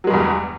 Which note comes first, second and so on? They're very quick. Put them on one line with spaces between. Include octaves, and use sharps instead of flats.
F#3 G#3 G2 E2